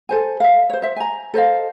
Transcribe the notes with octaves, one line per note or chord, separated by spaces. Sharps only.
A4 C5 G#5
E5 F5
C5 C#5
C5 E5
G#5 A#5
A4 C5 D#5 F5